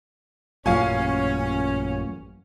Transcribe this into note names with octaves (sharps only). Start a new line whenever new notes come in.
A1 F#2 A#2 C#4 F4 F5 G#5